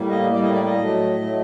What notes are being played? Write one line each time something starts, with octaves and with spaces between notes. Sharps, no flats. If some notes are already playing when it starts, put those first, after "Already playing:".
Already playing: A2 G3 A#3
D#5
A2 G3 A#3 D5
D#5
D5
D#5
A2 F#3 A3
A2 F#3 A3